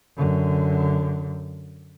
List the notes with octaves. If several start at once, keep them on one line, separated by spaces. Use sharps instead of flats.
F#2 D3